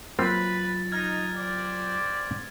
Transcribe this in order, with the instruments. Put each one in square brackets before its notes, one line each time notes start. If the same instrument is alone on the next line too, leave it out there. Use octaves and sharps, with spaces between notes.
[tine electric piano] F#3 F4 [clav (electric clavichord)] A#3 C4 F5 [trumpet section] B4 B5 [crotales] A6
[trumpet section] D#4 [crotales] F6 G#6
[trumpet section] G4 C5 D5